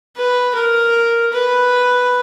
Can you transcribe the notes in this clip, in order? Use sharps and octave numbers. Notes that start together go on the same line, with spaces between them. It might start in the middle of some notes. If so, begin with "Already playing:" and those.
B4
A#4
B4